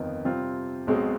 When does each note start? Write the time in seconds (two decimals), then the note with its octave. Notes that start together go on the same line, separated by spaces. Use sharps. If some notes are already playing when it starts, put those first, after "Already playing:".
Already playing: G1 F2 D#3 B3 D#4
0.25 C3 G3 C4 F4
0.87 B1 B2 G#3 C4